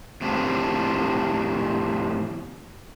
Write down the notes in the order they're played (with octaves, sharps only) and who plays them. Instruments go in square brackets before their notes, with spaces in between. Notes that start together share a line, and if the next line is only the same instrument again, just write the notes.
[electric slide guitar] E2 A2 C3 F3 D4